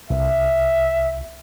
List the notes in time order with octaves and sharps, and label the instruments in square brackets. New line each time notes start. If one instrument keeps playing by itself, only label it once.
[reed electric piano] C2 [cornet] E5